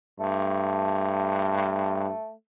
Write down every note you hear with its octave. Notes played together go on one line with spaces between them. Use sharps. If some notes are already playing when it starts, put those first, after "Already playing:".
G2 A3